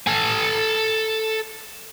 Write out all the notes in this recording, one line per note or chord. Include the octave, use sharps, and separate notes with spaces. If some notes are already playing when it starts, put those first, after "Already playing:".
A4 G#5